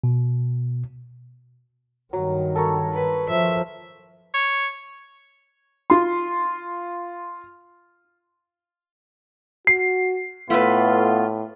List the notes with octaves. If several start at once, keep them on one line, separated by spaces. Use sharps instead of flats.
B2
G2 D#3 F#3
A4 A#4 C#5
B4
F3 E5
C#5
F4 C6
F#4 C7
A2 A3 B3 F4 B4